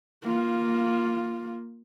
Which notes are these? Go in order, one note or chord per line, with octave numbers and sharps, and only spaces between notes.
A#3 F4